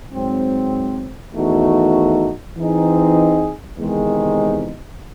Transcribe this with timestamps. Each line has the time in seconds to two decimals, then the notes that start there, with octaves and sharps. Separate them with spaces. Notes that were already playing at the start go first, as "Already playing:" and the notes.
0.13 G#2 F#3 C4
1.35 E2 D#3 A3 D#4 F#4
2.57 E3 C4 D#4 G#4
3.78 E2 C3 D#3 G#3 D#4